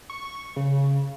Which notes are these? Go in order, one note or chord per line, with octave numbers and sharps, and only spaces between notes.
C#6
C#3